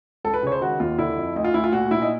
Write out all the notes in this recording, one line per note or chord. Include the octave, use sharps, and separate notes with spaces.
C#2 A4
B4
C#3 C#5
C5
D#3 F#4
D#2 F4
D3 E4
F2
D2 D#4
F4
D2 E4
F4
A#2 F#4
A#2 E4
D#4